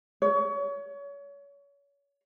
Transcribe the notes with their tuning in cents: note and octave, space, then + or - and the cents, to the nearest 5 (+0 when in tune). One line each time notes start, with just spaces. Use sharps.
C#5 +30